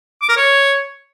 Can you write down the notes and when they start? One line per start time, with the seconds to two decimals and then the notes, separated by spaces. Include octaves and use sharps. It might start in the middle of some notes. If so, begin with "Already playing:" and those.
0.22 D6
0.29 A#4
0.37 C#5